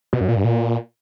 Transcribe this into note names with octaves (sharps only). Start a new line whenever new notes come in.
B2
F#2
A#2
G2
A#2